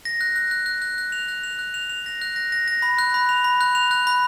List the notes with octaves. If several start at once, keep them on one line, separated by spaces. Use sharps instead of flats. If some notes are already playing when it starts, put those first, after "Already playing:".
A#6
F#6
F#6
F#6
F#6
F#6
F#6
F7
F#6
F7
F#6
F7
F7
A#6
F#6
A#6
A#6
A#6
B5
F#6
B5
F7
B5
F#6
F7
F#6
B5